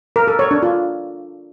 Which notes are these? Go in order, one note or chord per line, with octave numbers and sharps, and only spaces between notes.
A#4
A4
C#5
D4
F4